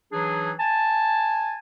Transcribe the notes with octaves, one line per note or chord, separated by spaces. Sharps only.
E3 F#3 D4 D#4 G#4
G#5 A5